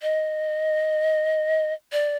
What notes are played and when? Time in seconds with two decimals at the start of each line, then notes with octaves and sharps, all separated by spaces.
0.02 D#5
1.92 D5